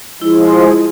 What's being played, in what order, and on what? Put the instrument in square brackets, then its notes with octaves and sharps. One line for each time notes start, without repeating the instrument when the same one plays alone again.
[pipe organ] F3 G#3 [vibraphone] E4 G#4